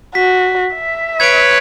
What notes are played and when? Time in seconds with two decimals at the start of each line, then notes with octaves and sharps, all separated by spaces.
0.15 F#4 B6
0.75 E5
1.20 B4 C#5 G#6 D7